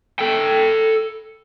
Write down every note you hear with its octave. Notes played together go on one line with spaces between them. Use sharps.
A4 G5